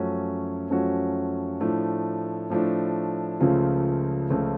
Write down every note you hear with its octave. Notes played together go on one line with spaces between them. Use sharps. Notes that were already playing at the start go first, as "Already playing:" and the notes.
Already playing: F#2 F3 A3 C#4 F#4
F#2 F3 A3 C#4 F#4
A2 F3 A3 D4
A2 F3 A3 D4
C#2 C#3 F3 A3 F4
C#2 C#3 F3 A3 F4